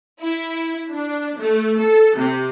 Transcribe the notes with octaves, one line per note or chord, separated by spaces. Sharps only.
E4
D4
A3
A4
C3